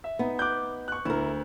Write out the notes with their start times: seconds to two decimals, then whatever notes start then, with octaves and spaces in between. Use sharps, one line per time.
0.04 E5
0.19 B3 D#4
0.39 D6 F#6 G6
0.88 C#6 F#6
1.05 D2 E4 A#4